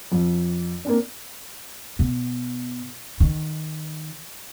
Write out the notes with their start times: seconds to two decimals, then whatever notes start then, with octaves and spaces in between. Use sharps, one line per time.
0.12 F2
0.85 A#3 C4 D4
1.99 B2
3.20 D#3